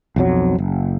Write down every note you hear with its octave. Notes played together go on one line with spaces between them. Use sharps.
B1 F2 F#3
F#1